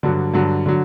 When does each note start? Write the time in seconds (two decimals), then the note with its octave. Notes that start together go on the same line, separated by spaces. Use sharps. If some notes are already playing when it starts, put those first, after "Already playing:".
0.03 G2 D3 F#3
0.34 G2 D3 F#3
0.66 D3 F#3